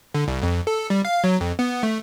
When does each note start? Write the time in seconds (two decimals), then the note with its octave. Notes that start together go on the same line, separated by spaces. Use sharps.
0.15 D3
0.28 C2
0.43 F2
0.67 A4
0.90 G3
1.05 F5
1.24 F#3
1.41 F2
1.59 B3
1.83 A3